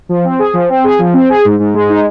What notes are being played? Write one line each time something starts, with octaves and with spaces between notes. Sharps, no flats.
F3
C4
G#4
F3
C4
G#4
F3
C4
G#4
G#2
G#2
G#3
D#4